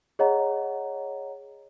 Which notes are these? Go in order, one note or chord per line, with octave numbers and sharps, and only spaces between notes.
G#4 C#5 D#5 F#5 A#5